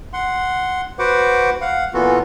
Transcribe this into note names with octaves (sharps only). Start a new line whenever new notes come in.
F#5 C6
F#4 B4 C5 F#5 D6
F5 F#5
A#2 E3 B3 F4 F#4 A4